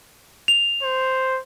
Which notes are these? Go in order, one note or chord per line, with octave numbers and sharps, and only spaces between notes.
F7
C5